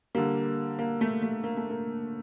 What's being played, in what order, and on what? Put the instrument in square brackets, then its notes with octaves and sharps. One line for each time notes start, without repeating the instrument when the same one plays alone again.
[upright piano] D3 G3 A#3
A#3
A3
A3
A#3
A3
A#3